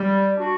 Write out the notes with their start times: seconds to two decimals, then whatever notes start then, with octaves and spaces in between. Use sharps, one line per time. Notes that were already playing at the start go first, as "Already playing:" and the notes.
Already playing: G3
0.37 D4 F#4